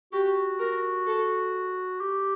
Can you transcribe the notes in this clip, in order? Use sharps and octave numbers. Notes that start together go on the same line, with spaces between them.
F#4 G4
A#4
A4
G4